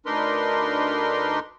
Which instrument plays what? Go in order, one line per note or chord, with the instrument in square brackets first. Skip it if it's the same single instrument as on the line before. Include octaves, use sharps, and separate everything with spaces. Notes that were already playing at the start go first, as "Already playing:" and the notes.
[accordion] D2 D4 D#4 A#4 B4 C6